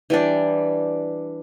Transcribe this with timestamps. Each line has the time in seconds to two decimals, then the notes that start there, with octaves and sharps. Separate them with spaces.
0.10 E3 G3 D4